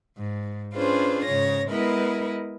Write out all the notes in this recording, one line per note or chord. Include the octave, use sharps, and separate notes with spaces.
G#2
C#4 D4 F4 G#4 B4 C5
G#2 C#3 C#5 A#6
G#3 B3 E4 A#4 B4 D#5